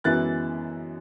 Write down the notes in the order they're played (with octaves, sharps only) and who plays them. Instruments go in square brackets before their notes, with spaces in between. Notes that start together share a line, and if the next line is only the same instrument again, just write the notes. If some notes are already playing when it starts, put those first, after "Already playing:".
[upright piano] F#2 E3 G#3 B3 E4 F#6 A6